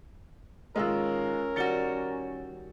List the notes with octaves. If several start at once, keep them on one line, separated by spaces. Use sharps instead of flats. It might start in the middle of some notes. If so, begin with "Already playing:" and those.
A#2 D#3 G#3 C#4 F4 A#4 E6
D#3 G3 F#4 A6 C#7 G7